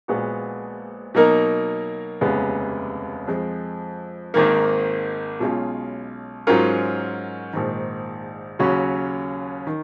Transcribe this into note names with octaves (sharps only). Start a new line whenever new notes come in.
A#1 A#2 G#3 B3 F#4
B2 F#3 A#3 D#4 A#4
F1 D#2 C#3 G#3 B3
F2 F3 G#3
G#1 G#2 D#3 A#3
B1 B2 G#3 C#4 F4
G#2 F#3 C#4 F4 A#4
A#1 G#2 D#3
D#2 C#3 F#3 C#4 F#4
D#3